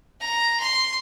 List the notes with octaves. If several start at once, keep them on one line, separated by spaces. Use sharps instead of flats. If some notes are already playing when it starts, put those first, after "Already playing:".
A#5
C6